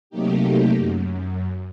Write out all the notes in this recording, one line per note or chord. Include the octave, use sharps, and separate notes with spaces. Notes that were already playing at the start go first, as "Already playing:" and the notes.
C3 F#3 A3 A#3 D#4 G4
F#2